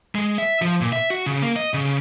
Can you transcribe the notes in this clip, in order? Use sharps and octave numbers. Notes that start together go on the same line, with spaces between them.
G#3
E5
F3
A#2
E5
F#4
C#3
A#3
D#5
C#3